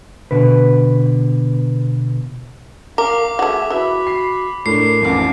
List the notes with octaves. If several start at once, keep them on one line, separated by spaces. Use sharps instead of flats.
B2 D3 B4
A#4 F5 D6
A3 F#4 G#4 E5
E3 F#4 E5 B5
C7
A2 D4 A#4 C7
A1 F2 D#4 D6